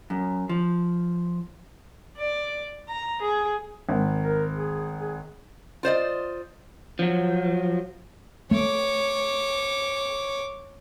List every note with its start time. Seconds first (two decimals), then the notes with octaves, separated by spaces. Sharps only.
0.10 F#2
0.49 F3
2.18 D5
2.89 A#5
3.22 G#4
3.89 G#1
4.18 A#4
4.54 G#4
4.99 G#4
5.83 F4 C5 D5 D#5
6.99 F3 F#3
8.51 A3 C#5 D6